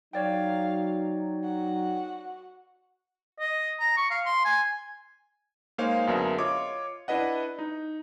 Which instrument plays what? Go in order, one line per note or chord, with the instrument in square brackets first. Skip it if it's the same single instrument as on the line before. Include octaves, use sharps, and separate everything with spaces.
[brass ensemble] F#3 D#4 [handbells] C#5 D5 G5 [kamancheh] F5
[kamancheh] F#4 F#5
[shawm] D#5
A#5
C#6
F5
C6
G#5
[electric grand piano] G#3 A#3 D#4 C5 C#5 F5
F#2 D3 B3 G#4 A#4 E5
F4 C#5 D#5 D6
D4 E4 B4 D#5 F#5
D#4